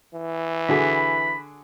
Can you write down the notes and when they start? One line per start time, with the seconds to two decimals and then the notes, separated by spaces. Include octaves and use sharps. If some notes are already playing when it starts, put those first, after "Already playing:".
0.14 E3
0.69 D3 F#4 G#4 B5